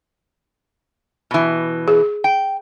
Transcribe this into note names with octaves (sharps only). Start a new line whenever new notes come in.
B2 E3
G#4
G5